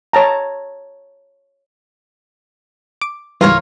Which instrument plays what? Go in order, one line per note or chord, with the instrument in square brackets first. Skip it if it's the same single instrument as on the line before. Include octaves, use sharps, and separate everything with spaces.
[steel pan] C#5 A5 A#5
[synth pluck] D6
[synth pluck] C#2 G#2 E3 [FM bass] G3 [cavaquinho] F4 A#4 C#5